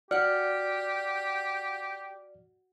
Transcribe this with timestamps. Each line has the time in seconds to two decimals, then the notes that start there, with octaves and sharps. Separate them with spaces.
0.11 F#4 G4 D5 F#5 F6